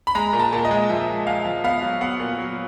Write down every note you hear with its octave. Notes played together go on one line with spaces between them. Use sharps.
B5
G#3 A#5
A#2
A5
A#2
D#5
G#3
F3 E5
G#3
G#3 F5
F3
B3 F5
F#3
B3 F#5
A#2
F#3